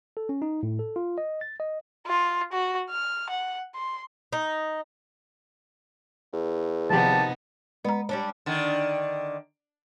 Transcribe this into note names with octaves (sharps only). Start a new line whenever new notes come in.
A4
C#4
D#4
A2
A4
F4
D#5
A6
D#5
F4
F#4
F6
F#5
C6
D#4
E2
C3 D#3 F3 B3 D#4 G4 A5
G#3 B3 A#5
G3 C#4 D4
D3 D#3